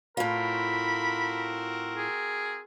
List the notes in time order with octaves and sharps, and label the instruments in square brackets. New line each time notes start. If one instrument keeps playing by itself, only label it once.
[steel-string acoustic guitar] A2 F4 [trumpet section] C4 F#4 A#4 [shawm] B5
[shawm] G#4